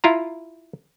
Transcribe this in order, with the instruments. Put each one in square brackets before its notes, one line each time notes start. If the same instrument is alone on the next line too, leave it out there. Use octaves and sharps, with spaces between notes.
[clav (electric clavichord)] E4 F4 A#5